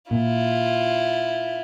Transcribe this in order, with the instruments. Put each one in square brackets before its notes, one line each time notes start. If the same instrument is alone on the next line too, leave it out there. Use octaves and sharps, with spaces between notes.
[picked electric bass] A#2 [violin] E4 F4